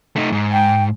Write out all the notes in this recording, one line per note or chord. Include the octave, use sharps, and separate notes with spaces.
A3 D#4
G#2
G5